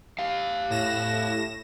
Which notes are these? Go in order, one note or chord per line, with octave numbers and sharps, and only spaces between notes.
G4 F5
A2 A#6 E7